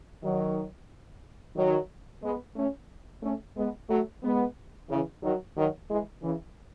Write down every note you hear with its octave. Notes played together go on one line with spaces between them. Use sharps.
D#3 F#3
D#3 F#3
G#3 B3
A3 C#4
A3 C#4
G#3 B3
F#3 A3
G#3 B3
C#3 E3
D#3 F#3
D#3 F#3
E3 G#3
C#3 E3